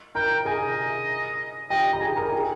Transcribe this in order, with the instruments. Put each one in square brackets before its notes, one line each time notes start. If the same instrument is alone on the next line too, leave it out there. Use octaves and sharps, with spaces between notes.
[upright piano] A#4 A#5 [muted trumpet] G5
[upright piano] G#4 G#5 [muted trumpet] D#5
[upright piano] G4 G5 [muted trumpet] D#5
[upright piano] A#5
G#4 G#5
A#4 A#5
G#4 G#5